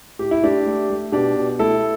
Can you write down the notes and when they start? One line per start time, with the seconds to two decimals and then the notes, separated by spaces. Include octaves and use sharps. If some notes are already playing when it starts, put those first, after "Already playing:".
0.19 A2 G4
0.31 E4
0.43 A3 D4 G4
0.66 A3
0.90 A3
1.12 B2 D4 G4
1.36 B2
1.59 A3 E4 A4